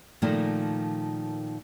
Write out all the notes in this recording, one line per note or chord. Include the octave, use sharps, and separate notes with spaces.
A#2 D#3 F3 A3 A#3